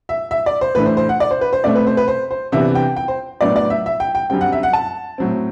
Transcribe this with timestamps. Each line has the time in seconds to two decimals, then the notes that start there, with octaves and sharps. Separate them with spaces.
0.09 E5
0.31 E5
0.46 D5
0.61 C5
0.75 A2 E3 A3 D4 B4
0.86 C5
0.97 C5
1.09 F#5
1.20 D5
1.31 C5
1.41 B4
1.53 C5
1.64 B2 A3 C4 D5
1.75 B4
1.87 C5
1.97 B4
2.08 C5
2.31 C5
2.52 C3 E3 B3 D4 E5
2.75 G5
2.96 G5
3.08 C5
3.41 A2 F#3 B3 D4 D5
3.56 D5
3.70 E5
3.86 E5
4.00 G5
4.15 G5
4.30 F#2 D3 G3 C4 G5
4.41 F#5
4.52 E5
4.63 F#5
4.73 A5
5.18 A2 F#3 C4